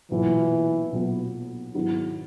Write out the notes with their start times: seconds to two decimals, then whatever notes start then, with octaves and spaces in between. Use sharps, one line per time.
0.10 B1 A#2 E3 F#3 B3
0.92 B1 A#2 F#3 B3
1.75 G#2 D#3 F#3 B3 E4